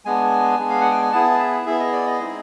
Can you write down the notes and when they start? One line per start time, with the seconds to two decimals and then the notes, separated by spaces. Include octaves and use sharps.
0.05 G#3 B3 D4 G#5
0.59 G#3 B3 D4
0.70 F5
0.81 F#5
0.91 G5
1.02 G#5
1.12 B3 E4 G#4 A5
1.39 E5
1.66 B3 E4 G#4 E5
1.80 D#5
1.92 D5
2.06 D#5
2.20 G#3 C4 D#4 G#4